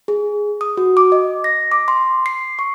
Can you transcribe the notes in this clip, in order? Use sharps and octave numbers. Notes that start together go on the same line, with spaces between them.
G#4
D#6
F#4
D6
D#5
A#6
D6
C6
C7
C#6